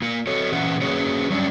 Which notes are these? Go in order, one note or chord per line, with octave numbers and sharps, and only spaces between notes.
A#3 F4
F#4 A4 C#5
A#2 E3 C#4 F4 B4 F#5
A#3 C#4 F#4 G#4 B4 C#5
F#3 G3 C#4 D4